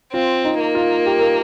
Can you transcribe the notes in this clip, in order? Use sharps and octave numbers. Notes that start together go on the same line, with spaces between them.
C4 F4
D#4
A#3
F4
G4
A#4